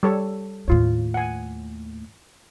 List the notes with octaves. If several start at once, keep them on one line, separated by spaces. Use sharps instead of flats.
G3 A4 C#5
D#2 A2 F4 C#5
F#5 G#5